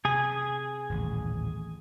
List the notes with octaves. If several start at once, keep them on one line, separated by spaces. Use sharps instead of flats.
C3 G#4 G#5
D#1 A1